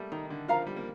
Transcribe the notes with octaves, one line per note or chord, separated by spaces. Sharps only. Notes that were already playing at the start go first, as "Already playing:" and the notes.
Already playing: G3 A3 A#3
D#3 D#4
D3
F3 A#4 F5 A#5
G3
A#3